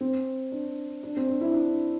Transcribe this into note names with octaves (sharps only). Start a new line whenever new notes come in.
C4
D4
D4
C4
D4
E4
D4